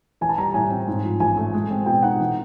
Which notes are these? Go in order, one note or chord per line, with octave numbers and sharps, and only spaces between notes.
E3 G#5
A5
G3 A#5
A2 G#5
C4
G#2
F3
A1 G#5
A3
G#3
C4
B2 G5
D#4 F#5
E3